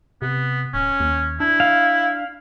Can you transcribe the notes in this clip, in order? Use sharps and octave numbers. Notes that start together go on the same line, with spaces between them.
C3 B3
D1 C#4
D#2
D4 E4
F5